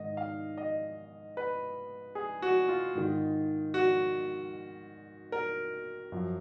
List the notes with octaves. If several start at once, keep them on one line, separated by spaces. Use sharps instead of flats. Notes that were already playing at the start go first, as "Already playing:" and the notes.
Already playing: G#2 D#3 D#5
F5
D#5
B4
G#4
F#4
F4
G#2 D#3
F#4
A#4
F#2 F3